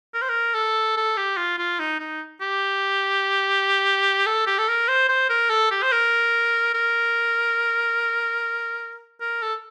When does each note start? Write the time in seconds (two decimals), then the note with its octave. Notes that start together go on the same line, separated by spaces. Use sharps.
0.14 A#4
0.22 C5
0.29 A#4
0.54 A4
0.97 A4
1.17 G4
1.37 F4
1.59 F4
1.79 D#4
1.99 D#4
2.41 G4
4.26 A4
4.47 G4
4.59 A4
4.68 A#4
4.88 C5
5.09 C5
5.29 A#4
5.50 A4
5.71 G4
5.83 C5
5.92 A#4
6.74 A#4
9.21 A#4
9.43 A4